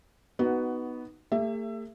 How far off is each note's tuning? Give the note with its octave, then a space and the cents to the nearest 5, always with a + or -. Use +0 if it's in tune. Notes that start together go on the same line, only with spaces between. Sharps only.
B3 +0 D#4 +0 F#4 +15
A3 +45 G#4 -45 E5 +20